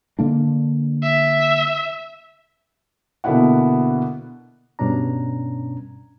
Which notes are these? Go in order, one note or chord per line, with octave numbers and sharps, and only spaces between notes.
D3 A#3 D4
E5
B2 D3 A#3 B3 E4 F#5
G2 B2 C#4 D4 A#5